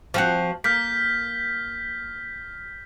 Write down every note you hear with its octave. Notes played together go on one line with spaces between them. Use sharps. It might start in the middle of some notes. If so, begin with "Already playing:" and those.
F3 C4 F#4
A#3 F6 G6 B6